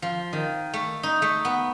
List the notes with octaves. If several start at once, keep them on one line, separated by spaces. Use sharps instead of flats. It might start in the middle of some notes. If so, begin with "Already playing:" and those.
F3
D#3
A3
D#4
A3
B3